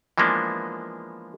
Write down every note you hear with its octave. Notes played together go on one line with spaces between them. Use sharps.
E3 F3 G#3 A#3 B3 D4